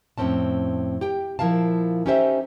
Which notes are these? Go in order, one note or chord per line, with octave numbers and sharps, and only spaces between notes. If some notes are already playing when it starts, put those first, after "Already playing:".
F2 A2 C3 C4 C#4 A5
G4 G5
A#2 F3 E4 A#4 F5 A5
C#4 D#4 G4 A4 C5 E5